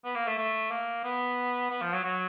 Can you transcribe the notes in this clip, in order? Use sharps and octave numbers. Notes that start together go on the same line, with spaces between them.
B3
A#3
A3
A3
A#3
B3
B3
F3
F#3
F#3